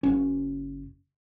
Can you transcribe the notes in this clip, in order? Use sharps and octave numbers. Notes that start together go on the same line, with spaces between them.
F#1 C#4